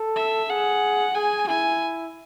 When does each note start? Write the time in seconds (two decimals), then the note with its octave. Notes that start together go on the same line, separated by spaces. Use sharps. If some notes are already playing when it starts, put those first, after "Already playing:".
Already playing: A4
0.16 E5
0.49 G#4 F#5
1.15 G#4 G#5
1.47 E4 G#5